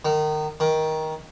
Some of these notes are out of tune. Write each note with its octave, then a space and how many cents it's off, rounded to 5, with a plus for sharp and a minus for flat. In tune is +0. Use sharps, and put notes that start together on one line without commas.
D#3 -25
D#3 +15